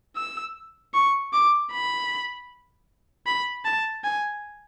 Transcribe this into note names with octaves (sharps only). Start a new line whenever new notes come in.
E6
C#6
D6
B5
B5
A5
G#5